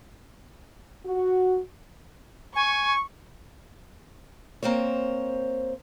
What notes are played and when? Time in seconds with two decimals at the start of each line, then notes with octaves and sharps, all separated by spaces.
1.06 F#4
2.55 G#5 C#6
4.63 A#3 C4 C5 C#5